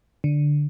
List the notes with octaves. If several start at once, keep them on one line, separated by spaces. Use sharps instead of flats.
D3